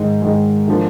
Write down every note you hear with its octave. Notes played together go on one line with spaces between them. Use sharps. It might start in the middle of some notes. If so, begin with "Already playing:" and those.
Already playing: G#2 D#3 G#3
G#2 D#3 G#3
D3 F3 A#3